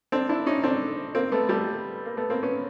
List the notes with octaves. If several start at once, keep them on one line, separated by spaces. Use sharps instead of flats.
C4 D4
D4 E4
C#4 D#4
C4 D4
A#3 C4
A3 B3
G3 A3
A#3
A3 B3
A#3 C4
B3 C#4